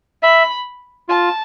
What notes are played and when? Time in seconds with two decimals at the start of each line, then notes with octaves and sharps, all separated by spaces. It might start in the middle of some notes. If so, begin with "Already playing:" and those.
0.23 E5 B5
1.09 F4 A5